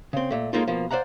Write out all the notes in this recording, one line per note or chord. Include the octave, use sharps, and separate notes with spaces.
C#3 C4
A#2 A3
A2 G#3 A#3 D#4 F4
B2 F3 A#3
C5 D5 F5 F#5 A#5